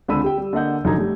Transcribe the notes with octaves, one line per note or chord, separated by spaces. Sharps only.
C#2 D3 C4 B5 E6 D#7
G4 G5
G3
D3 A#3 D#5 F#5 G6
F1 F#2 D3 D#4 A#5 G#6
G3 A3